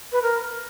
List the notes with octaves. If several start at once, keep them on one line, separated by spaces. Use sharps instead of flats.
B4
A#4